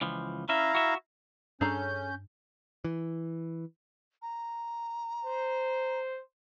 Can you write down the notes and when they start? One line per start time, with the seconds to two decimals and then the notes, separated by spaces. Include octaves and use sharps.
0.01 C#2 E3 F3
0.49 C#4 E4 E5 F5 A#5
0.75 F#4 E5
1.61 G2 C#4 D4 G#4 A4 A#5 G6
2.84 E3
4.22 A#5
5.25 C5